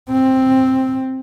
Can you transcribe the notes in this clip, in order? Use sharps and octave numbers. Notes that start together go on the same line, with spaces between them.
C4